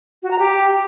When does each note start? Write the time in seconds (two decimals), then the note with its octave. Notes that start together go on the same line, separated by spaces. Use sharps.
0.23 F#4
0.31 A#5
0.39 G4